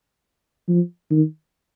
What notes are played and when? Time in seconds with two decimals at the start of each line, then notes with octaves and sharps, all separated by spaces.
0.68 F3
1.10 D#3